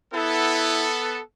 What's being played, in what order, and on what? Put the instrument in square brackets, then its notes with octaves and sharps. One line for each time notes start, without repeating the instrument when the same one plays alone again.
[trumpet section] B3 A4 [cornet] E4